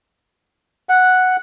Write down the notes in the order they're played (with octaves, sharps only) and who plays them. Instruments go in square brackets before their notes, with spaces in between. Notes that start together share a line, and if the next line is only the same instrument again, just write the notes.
[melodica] F#5